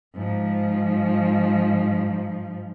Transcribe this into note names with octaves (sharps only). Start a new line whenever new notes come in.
G#2 F3